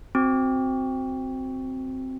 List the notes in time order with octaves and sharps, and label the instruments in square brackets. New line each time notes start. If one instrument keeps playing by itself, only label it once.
[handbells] C4 F#4